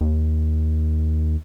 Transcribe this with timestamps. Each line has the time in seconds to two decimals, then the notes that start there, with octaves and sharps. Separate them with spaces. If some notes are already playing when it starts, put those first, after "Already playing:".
0.01 D#2